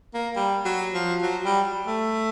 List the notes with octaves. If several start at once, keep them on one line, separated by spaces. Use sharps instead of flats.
A#3
G3
F#3
F3
F#3
G3
A3